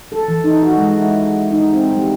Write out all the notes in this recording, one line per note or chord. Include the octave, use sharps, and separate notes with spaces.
A4
E3
D#4
F#4
G#3
E4
D#4
C4
G3